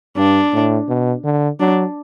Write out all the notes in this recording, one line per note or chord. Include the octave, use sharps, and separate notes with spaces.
G2 D4
A2
B2
D3
F#3 D4